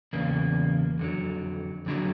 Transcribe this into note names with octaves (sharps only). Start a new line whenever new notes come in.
E2 C#3 A#3
F2 D3 F#3
F2 D3 F#3